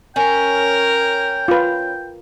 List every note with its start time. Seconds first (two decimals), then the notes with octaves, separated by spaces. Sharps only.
0.16 C#4 A#4 G5
1.48 F4 B4